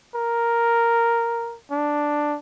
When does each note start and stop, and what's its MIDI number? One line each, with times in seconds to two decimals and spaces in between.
0.15 1.57 70
1.71 2.38 62